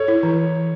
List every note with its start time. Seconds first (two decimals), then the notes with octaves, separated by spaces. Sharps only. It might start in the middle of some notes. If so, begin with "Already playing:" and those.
Already playing: A4 C#5
0.08 E4
0.23 E3